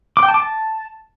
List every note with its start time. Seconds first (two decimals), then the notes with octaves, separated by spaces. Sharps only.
0.17 D6
0.23 G5
0.28 A5
0.34 D6
0.40 A5